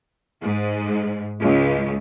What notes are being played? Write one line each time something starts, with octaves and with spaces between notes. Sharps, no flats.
G#2
C#2